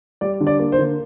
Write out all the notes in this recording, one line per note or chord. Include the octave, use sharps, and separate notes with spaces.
G3 D5
D3
D5
A#3
C5
D3